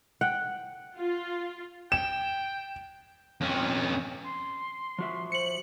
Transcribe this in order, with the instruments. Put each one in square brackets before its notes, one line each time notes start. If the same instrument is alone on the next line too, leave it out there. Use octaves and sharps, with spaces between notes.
[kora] F#5 G5
[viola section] F4
[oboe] G5 [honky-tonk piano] E7
[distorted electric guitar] F2 C#4
[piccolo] C6
[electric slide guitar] F3 F#4 E5
[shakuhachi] C5 [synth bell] C#7 F#7